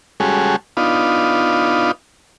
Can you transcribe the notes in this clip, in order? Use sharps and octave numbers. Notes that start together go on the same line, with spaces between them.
G3 G#3 C#4 F#4 G#4 A4
B3 D4 D#4 F4